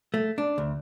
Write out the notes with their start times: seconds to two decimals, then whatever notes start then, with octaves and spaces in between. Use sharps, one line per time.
0.14 A3
0.38 D4
0.58 D2